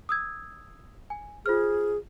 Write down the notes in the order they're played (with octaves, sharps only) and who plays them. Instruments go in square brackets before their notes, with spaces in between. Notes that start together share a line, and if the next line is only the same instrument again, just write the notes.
[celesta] D#6 E6 G#6
G#5
[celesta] F4 C5 F6 [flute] G#4